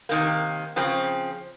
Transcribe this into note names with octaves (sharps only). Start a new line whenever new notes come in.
C3 D#3 A#3
C#3 F3 C4